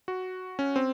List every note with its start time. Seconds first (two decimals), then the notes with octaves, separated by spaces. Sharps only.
0.08 F#4
0.59 C#4
0.76 C4